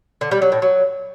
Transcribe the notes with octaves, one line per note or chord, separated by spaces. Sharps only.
D3
G3
F#3
A2
F#3